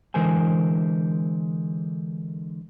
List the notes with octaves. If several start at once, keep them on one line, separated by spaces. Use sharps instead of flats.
D3 E3 G#3 A#4 C5 G#5